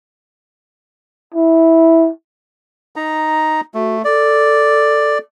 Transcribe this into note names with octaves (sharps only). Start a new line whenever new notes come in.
E4
D#4 A#5
A3 F#4
A4 D5